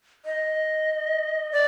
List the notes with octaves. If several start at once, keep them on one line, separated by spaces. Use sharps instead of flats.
D#5
D5